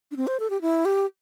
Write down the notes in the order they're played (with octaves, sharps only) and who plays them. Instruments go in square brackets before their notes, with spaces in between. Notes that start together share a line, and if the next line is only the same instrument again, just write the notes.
[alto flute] D4
C4
C5
A4
G4
E4
G4